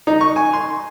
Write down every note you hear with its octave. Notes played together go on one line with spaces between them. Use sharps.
D#4
C#6
G#5
C6